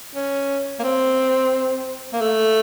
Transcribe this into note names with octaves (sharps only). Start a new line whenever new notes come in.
C#4
A#3
C4
A#3
A3